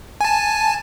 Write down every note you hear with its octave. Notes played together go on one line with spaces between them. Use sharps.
G#5 A5